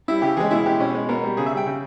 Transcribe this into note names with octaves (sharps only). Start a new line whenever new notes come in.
G3 E4
C#3 G4
E3 G#3 G#4
B2 E4
G#3 G4
B2 C#4
G#3
B2 A#4
G3
C#3 G#4
E5
G3
G5
C#3